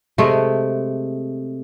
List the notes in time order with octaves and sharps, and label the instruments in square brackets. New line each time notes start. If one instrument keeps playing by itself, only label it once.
[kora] C3 G#3 A3